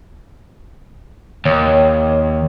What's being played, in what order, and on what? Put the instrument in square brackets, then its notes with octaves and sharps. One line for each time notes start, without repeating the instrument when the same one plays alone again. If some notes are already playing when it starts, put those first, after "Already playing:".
[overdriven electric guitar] D#2 [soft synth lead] C#5